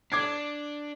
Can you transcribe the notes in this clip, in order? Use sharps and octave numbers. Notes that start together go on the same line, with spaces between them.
D4 D6 G#6 C7